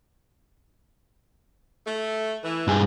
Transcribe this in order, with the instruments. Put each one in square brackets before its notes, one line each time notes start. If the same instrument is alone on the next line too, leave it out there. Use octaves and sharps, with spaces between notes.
[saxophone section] A3
E3
[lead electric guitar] G2 G#4